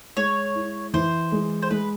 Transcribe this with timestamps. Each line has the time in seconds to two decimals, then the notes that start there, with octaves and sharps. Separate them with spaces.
0.17 G#3 C#5
0.55 E4
0.94 E3 C5
1.32 G#3
1.62 C5
1.71 G#3 B4